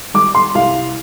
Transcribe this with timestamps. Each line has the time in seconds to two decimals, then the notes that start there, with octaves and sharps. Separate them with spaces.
0.14 G3 D6
0.35 C6
0.55 C2 F5